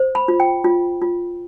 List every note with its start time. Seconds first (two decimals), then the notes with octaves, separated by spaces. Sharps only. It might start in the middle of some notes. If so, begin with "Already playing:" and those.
Already playing: C5
0.15 B5
0.28 F4
0.40 G5
0.64 F4
1.02 F4